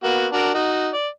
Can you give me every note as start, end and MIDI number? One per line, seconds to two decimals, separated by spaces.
0.04 0.27 58
0.04 0.27 59
0.04 0.27 66
0.32 0.50 62
0.32 0.50 66
0.32 0.50 70
0.54 0.90 63
0.54 0.90 66
0.94 1.08 74